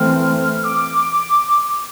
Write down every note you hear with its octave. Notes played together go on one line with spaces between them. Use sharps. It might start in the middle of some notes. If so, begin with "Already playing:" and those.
Already playing: E3 A3 C4 F6
D6